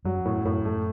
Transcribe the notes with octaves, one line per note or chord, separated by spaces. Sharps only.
F#2 F#3
F#2 A2
F#2 A2
F#2 A3